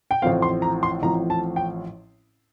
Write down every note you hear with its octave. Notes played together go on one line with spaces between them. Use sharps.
G5
A1 A2 F3 C4 F5
C6
A#5
C6
A1 A2 F3 C4 A#5
A5
G5